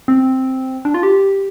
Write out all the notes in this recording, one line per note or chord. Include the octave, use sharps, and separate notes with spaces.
C4
D4
F4
G4